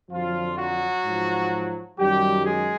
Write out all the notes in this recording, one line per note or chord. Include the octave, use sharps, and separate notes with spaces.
F2 D3 F3 F#3 F4
F#3 F#4
G#2 F3
F#2 D#3 F#3 G3 G4
G#3 G#4